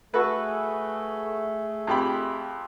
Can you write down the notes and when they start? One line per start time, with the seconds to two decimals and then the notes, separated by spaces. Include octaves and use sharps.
0.14 A3 F#4 G#4 A4 B4
1.87 F2 G4 B5